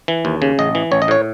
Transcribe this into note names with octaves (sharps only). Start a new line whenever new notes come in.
E3
D#2
C#3
A1 D#5
E3
A1 C#5
D#5
A2 C#5